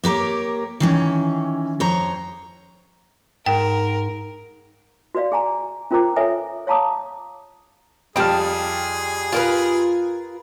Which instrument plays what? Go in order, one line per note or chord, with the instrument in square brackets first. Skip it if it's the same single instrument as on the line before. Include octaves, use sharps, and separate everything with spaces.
[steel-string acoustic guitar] A#3 G4 A#4 C#5
D#3 E3 C#4
F2 C5 C#5 A#5
[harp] G#2 [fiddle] A#4 [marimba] G5
[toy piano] F#4 B4 D5 F5
G#4 G#5 A#5
C#4 F4 A#4 C5 A#5 D6
A4 B4 C#5 E5 G#5
C#5 F5 A5 A#5 D6 D#6
[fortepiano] F2 G3 F6 [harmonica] G#4 [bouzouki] G5 A5
[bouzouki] F4 A#4 B4